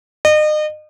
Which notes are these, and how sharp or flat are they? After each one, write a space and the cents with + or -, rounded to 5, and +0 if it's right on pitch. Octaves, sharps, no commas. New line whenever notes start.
D#5 -35